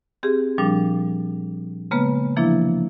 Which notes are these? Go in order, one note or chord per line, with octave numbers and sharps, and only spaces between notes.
C4 G4 G#4
A#2 F3 G3 D4
C#3 G#3 A#3 B3 B4
C3 E3 F3 A#3 D4 E4